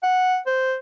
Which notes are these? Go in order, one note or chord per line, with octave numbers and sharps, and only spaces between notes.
F#5
C5